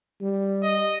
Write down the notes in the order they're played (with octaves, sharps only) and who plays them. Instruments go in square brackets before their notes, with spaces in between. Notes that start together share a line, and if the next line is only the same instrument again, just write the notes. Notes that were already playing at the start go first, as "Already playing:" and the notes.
[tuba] G3
[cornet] D#5